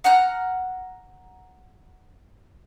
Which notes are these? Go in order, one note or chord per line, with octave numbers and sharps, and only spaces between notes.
F#5 A#5 F6 F#6